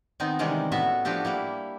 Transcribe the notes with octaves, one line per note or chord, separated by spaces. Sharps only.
D#3 B3 C4 D#4
C3 D#3 E3 G3 G#3 C#4
A2 B3 F#4 E5
F3 D4 F#4 G4 A4
G3 A#3 E4